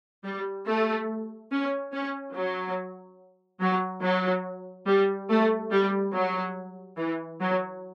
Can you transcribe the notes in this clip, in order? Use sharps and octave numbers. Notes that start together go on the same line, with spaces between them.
G3
A3
C#4
C#4
F#3
F#3
F#3
G3
A3
G3
F#3
E3
F#3